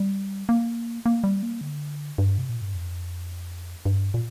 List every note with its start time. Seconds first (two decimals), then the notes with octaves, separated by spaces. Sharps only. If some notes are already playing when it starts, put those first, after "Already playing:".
Already playing: G3
0.49 A#3
1.06 A#3
1.24 G3
1.43 A#3
1.61 D3
2.18 G2
2.38 C3
2.49 A#2
2.62 G2
2.74 F2
3.85 G2
4.14 A#2